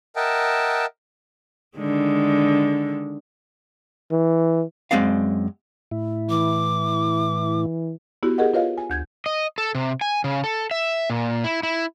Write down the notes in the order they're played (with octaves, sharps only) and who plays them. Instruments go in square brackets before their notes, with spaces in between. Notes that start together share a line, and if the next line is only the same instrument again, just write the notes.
[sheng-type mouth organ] A#4 D#5 E5 F#5 G5 A5
[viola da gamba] D3 D#3 G#3
[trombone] E3
[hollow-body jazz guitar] F#2 G#3 C4 D5 F5
[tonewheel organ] A2 E4
[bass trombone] E3 [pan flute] D6
[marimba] B3 E4 F#4 G4
G4 G#4 A#4 D#5 F#5
F4 B4 C#5 D#5 F5
G#5
D2 G6 G#6
[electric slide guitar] D#5
A4
C3
G#5
C#3
A4
E5
A#2
E4
E4